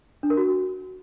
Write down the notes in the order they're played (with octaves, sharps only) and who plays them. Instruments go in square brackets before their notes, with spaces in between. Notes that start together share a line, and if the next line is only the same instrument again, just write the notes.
[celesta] D4
A#4
F#4